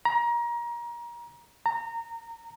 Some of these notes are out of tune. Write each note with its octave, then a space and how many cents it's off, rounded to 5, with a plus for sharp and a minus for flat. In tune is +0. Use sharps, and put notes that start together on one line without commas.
A#5 +25
A#5 -25